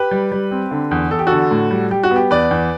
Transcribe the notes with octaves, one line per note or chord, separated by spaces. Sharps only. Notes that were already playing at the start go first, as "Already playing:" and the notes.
Already playing: G4 B4
G3
G3
C4
D3
E2
E2 A4
G4
D3 F#4 A4
A2
G3
G3 G4
F#4
B3
G4
E2 B4 D5
E2